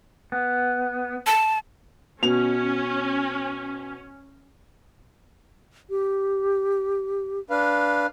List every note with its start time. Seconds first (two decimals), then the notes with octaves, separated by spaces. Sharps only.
0.32 B3
1.27 A5
2.23 B2 C#4 F7
5.90 G4
7.50 D4 B4 F5